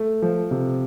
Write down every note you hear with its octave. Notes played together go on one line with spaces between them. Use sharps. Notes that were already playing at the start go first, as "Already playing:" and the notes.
Already playing: A3
F3
C3